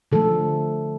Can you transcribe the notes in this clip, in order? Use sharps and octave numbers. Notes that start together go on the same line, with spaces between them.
D3 F3 A3 A4